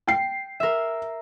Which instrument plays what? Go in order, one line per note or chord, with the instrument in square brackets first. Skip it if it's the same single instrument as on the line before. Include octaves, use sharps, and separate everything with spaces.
[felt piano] G5 C7
[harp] A#4 E5